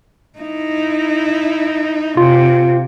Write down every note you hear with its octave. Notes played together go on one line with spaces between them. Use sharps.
D#4 E4
C3 F4